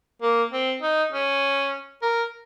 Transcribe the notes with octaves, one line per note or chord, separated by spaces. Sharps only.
A#3
C4
D#4
C#4
A#4